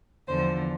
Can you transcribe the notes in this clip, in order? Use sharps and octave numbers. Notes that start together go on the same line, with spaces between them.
E2 D3 F3 C5